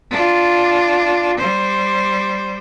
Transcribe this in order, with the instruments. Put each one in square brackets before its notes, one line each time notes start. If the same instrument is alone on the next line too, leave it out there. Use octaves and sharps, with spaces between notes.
[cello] D4 F4
G3 C5